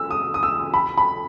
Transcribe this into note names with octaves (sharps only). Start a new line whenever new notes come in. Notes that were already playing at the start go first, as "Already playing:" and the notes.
Already playing: E6
D#6
D#6
E6
B5
B5